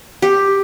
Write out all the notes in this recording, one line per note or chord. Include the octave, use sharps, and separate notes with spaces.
G4